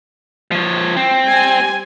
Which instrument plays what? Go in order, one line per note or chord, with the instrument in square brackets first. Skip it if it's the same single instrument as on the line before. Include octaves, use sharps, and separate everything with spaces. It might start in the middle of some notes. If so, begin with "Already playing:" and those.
[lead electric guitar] F3 C#5
C4
[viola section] G3 G#5